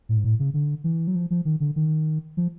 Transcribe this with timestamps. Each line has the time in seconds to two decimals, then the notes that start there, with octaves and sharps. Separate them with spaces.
0.09 A2
0.17 G#2
0.24 A2
0.39 C#3
0.54 D3
0.84 E3
1.07 F#3
1.15 F3
1.30 F3
1.45 D#3
1.60 D3
1.76 D#3
2.37 F3